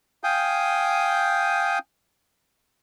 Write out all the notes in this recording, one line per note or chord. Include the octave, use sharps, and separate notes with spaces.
F5 G5 G#5 D#6 G6